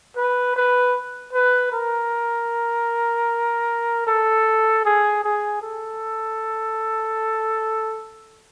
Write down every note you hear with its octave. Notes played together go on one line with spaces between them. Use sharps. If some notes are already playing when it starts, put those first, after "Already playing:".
B4
B4
B4
A#4
A4
G#4
G#4
A4